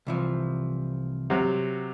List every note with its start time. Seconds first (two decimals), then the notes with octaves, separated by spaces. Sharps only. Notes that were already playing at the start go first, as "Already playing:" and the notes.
0.07 C2 E3 F3
1.30 C3 F#3